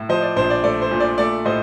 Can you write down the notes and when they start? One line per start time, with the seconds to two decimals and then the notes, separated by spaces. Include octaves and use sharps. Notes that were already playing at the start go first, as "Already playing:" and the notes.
Already playing: A2
0.09 F3 C5 D#5
0.22 D5
0.36 A#1 C5
0.50 D5
0.63 A3 D5
0.82 C5
0.91 A#2
1.00 D5
1.18 A3 D5
1.45 A2 C5 D#5